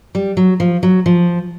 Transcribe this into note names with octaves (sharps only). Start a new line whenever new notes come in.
G3
F#3
F3
F#3
F3